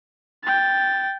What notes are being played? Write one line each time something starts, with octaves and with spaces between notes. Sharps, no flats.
G5 A6